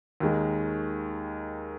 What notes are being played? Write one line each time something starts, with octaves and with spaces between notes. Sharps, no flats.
D#2 D#3 G#3